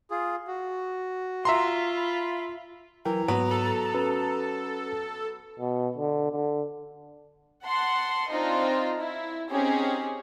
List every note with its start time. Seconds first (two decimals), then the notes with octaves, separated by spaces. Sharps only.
0.11 F4 G#4
0.48 F#4
1.45 F4 E5 A#5 C6
1.97 B5
3.05 E3 F#3 A#4 G5 A#5
3.28 G#2 F#3 B3
3.51 A4
3.94 C#4 F#4 B4
5.59 B2
5.98 D3
6.32 D3
7.65 F#5 A5 C6
8.30 C4 D4 D#4 F4 D#5
9.00 E4
9.51 C4 C#4 D#4 G4 G#4